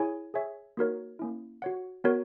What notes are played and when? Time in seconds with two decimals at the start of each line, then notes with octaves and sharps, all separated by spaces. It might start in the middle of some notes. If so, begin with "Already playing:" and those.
Already playing: E4 G#4 C#5 G#5
0.34 G#4 C#5 E5 G#5
0.77 A#3 D#4 F#4 A#4 C#5
1.19 A#3 C#4 E4
1.62 F#4 C#5 F#5
2.04 B3 F#4 A#4 C#5